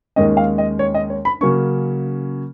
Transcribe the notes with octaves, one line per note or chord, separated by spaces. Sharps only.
D#2 D#3 G#3 C#4 D#5
F5
D#5
C#5
D#5
C#5
B5
C#3 F#3 A#3 C#4 C#6